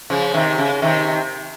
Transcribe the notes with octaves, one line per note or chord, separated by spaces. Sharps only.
C#3 F3
C3 D#3
C#3
C3 D#3